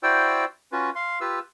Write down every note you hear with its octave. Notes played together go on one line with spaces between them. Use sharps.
E4 F#4 C5 D5 G5 E6
C#4 F4 F#4 B4
F5 C6
F4 G4 B4 E6